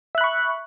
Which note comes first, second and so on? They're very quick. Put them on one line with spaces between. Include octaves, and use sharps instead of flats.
E5 F#6 B5 C#6